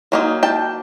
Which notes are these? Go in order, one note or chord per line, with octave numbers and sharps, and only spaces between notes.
F#3 A#3 D#4
G5 A5